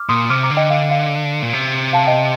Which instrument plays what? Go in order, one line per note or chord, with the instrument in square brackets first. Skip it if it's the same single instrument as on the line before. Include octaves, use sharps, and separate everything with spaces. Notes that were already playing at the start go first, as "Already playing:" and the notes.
Already playing: [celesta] D6 F6
[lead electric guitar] A#2 [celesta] C6 D#6
[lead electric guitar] C3 [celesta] D6 F6
[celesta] A#5 D6
[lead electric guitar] D3
[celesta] D#5 G5
F5
F5
[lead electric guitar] A#2
C3
[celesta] F5 A5
D#5 G5